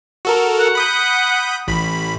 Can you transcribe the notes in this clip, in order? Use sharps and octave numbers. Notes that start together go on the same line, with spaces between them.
F#4 A4 A#4
F#5
B5 D#6 G6
A1 B5